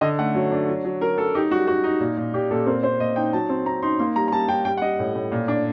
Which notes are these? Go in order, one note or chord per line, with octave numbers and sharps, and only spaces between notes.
D3 D#5
A3 F#5
F#3
D4
F#3
F#3
F#3 A#4
F#3 A4
D#4 G4
G3 F#4
D#4 F#4
D#4
A#2
A#2
A#2 G4
A#2 A4
C4 A#4
C4 C5
A#2 D#5
D#4 G5
F#3 A5
C4
C4 A#5
D#4 C6
A#3 C6
G3 A#5
A#5
G3 A5
G3 G5
G3 G5
F#5
G3 D#5
A2
A2
A#2
D4